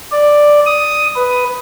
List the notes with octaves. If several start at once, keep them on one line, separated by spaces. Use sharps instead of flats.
D5
D#6
B4